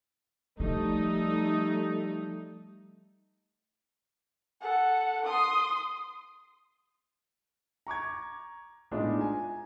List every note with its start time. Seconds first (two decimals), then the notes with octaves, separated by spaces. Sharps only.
0.60 F3 G3 A3 D#4
4.61 A4 F#5
5.25 C6 D#6
7.87 A#5 C#6 D6 G#6
8.91 A2 G#3 B3 D4 D#4 F4
9.19 G#5 A#5